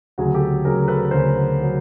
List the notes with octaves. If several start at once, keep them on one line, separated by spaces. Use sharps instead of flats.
D2 C#3 F#3 F#4 G#4
G4 A4
D2 C#3 F#3 G#4 A#4
A4 B4
D2 C#3 F#3 A#4 C5
C#3 F#3